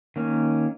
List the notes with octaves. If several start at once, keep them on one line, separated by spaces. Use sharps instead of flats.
D#3 A#3 C#4